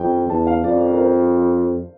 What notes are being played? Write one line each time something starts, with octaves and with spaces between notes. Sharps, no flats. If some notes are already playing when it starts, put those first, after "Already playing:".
Already playing: F2 G5
E2 A5
F5
F2 D5
A#4
C5